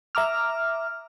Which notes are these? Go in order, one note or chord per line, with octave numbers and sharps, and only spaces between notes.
E5 A#5 D6 F6